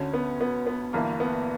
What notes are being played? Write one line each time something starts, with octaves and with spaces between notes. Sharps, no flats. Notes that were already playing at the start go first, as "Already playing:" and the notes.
Already playing: D2 D3 C#4
B3
B3
B3
G1 G2 E3 A#3
B3